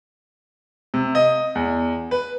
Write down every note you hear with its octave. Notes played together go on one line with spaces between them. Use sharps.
C3
D#5
E2
B4